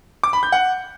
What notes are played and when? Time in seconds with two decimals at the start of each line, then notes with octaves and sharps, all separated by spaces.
0.23 D6
0.33 B5
0.43 G6
0.52 F#5